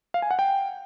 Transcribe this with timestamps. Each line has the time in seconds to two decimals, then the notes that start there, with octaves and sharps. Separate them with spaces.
0.14 F5
0.22 G#5
0.31 F#5
0.39 G5